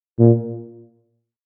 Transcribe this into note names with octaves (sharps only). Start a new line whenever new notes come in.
A#2